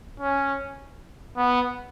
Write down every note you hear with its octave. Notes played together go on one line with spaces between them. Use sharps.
C#4
B3